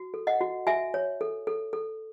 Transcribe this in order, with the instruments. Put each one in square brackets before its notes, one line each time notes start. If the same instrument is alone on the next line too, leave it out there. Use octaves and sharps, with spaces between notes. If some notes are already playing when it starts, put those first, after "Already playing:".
Already playing: [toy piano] F#4
A4
D#5 F#5
F#4
F#4 E5 G#5
C#5
A4
A4
A4